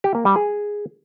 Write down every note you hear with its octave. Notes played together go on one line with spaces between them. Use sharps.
G4
A#3
G3
G#4